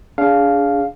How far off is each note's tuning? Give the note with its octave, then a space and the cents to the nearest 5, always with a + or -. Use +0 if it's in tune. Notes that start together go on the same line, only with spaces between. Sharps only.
D4 -30 G#4 +0 F5 +0